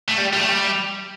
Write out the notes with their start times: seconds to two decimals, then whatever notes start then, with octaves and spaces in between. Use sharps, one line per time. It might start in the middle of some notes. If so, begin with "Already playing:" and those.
0.09 A3
0.18 G3
0.33 G3
0.41 A3
0.49 G3